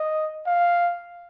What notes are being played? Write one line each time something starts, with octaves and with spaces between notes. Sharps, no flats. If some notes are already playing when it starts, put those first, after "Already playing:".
Already playing: D#5
F5